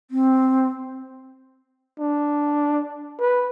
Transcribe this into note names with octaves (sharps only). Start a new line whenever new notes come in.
C4
D4
B4